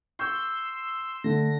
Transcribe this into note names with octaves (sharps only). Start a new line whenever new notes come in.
C6 C#6 E6 G6
D3 A3 A#6